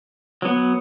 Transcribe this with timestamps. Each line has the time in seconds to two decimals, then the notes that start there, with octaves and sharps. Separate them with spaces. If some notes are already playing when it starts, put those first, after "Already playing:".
0.42 F#3 B3